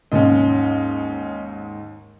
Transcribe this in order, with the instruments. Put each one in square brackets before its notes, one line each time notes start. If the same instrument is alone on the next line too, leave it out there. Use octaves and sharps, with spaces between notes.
[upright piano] D#2 G#2 [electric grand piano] C#4 D#5